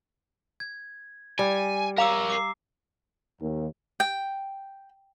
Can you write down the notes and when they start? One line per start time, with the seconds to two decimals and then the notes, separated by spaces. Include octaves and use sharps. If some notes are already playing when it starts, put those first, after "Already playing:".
0.60 G#6
1.39 G3 G#5
1.98 A#4 C#5 F5 A#5 D6 E6
2.30 D6 C7
3.42 D#2
4.00 G5